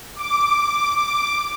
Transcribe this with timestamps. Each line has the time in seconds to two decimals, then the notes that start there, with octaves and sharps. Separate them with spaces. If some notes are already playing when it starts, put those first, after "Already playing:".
0.15 D6